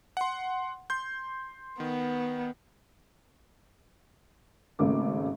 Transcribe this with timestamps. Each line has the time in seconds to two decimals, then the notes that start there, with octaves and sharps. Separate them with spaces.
0.17 F#5 C6
0.90 C6 G6
1.80 D#3 B3
4.79 G#1 C#3 A3 A#3 D6